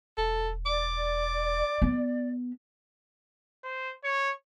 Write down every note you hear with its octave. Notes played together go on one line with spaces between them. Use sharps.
E1 A4
D5 D6
B3
C5
C#5